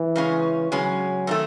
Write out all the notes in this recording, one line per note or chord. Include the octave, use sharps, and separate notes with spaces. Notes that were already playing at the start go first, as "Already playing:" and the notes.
Already playing: E3
C#3 G#3 C#4
C#3 F#3 G#3 C#4
C3 D#3 A3